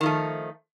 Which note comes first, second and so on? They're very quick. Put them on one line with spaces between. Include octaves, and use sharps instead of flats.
D#3 F3 A3